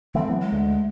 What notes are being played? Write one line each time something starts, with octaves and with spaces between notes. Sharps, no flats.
D3 E3 A3 C4
E3 F#3 B3
G#3
D2